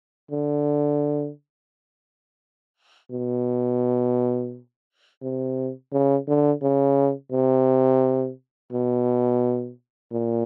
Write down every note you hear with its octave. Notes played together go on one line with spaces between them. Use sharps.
D3
B2
C3
C#3
D3
C#3
C3
B2
A#2